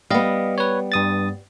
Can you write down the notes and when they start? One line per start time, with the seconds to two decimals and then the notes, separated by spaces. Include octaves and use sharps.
0.10 G3 B3 D#5 F5
0.58 B4 C#5
0.92 G2 D#6 A6